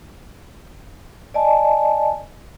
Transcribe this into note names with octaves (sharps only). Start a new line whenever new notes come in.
D5 D#5 G#5 A5